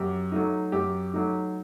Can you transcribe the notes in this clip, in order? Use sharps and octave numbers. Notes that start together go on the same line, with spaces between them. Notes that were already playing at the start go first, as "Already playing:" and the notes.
Already playing: F#2 G4
F#3 A3 D#4
F#2 G4
F#3 A3 D#4